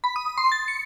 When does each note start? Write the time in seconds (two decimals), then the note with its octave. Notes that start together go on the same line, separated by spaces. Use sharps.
0.04 B5
0.16 D#6
0.38 C6
0.52 A6
0.68 C#7